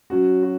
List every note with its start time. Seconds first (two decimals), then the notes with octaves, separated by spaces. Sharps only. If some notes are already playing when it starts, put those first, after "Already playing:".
0.10 F#3 C#4 F#4
0.43 F#4